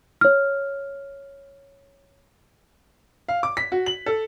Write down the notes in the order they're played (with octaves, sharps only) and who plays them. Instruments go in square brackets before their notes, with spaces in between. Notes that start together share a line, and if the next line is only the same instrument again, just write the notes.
[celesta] C#5 F6
[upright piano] F5
D6
B6
F#4
F#7
A4